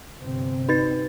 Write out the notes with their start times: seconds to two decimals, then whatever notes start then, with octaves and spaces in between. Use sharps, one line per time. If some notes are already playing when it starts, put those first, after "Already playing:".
0.23 G1 C3 C4
0.69 D#4 B4 A6